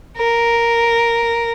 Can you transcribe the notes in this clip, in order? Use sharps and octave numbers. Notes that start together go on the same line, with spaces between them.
A#4